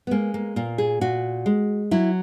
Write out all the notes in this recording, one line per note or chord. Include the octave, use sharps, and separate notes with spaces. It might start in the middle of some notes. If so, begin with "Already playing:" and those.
B3
G#3 A#3
A#3
A#2 A#3
G#4
A#2 F#4
G#3
F#3 E4